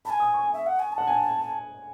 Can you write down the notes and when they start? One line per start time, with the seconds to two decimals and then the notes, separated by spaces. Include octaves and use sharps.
0.05 A5 B5
0.10 G#5
0.20 D#6
0.34 C#6
0.53 E5
0.67 F#5
0.79 G#5
0.92 A5
0.98 F#5
1.07 G#5